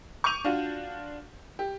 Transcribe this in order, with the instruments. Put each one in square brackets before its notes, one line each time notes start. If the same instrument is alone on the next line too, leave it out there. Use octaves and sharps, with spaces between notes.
[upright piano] C#6 D6 G6 D#7 F7
D4 F4 F#4
G4